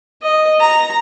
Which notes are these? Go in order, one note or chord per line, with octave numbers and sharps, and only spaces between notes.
D#5
A#5